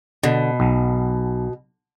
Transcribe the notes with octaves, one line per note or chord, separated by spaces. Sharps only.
B2 D3
B1